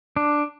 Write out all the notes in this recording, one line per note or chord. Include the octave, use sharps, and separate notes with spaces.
D4